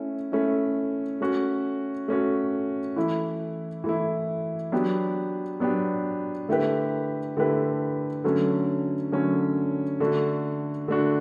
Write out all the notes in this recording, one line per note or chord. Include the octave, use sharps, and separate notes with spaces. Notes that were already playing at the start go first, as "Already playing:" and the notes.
Already playing: A3 C#4 E4
A3 C#4 E4
A3 C#4 F#4
A3 C#4 F#4
E3 A3 E4
E3 A3 E4
F#3 B3 D4 G4
F#3 B3 D4 G4
D3 A3 E4 G4 B4
D3 A3 E4 G4 B4
D3 F#3 A3 C#4
D3 F#3 A3 C#4
D3 A3 D4 F#4
D3 A3 D4 F#4